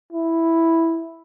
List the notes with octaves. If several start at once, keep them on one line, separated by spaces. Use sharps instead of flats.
E4